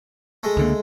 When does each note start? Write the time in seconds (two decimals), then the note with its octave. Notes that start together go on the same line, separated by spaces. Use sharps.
0.43 G#3 A3
0.57 C#2 D3 A#3